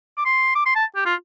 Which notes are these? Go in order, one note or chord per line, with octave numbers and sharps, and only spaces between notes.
D6
C6
D6
C6
A5
G4
F4